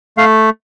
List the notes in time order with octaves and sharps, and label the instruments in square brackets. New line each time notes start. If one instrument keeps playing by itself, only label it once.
[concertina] A3 F5